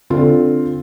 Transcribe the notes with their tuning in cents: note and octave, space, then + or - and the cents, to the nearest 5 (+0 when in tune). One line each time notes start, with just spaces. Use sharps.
D3 +0 C4 +0 F4 +0